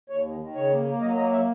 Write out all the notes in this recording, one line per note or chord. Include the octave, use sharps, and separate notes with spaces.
D#2 C#5
D#3
D#3
C#3 C#5
A#3
A#3
F#3 D#5
A#3 D#5
E5